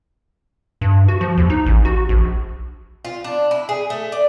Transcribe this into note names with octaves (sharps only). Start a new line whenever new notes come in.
G2
F#4
F3
D#2
D#4
A1
F#4
A#1
F4
D4
E4
G#4
A3
D5